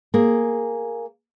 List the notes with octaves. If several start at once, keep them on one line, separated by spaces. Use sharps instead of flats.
A#3 G#4